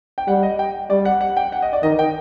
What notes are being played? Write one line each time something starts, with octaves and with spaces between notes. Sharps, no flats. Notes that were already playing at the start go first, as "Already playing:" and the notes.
G5
G3 F#5
D#5
G5
G3 D5
F#5
F#5
G5
F#5
D#5
D5
D#3 D#5
G5